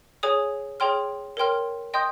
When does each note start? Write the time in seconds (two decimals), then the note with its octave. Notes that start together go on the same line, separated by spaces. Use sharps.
0.23 G#4 C#5 G#5 D#6
0.80 G#4 C#5 G5 C6 F6
1.37 A#4 C#5 G5 C6 F6
1.94 D#5 G5 C6 D#6 G6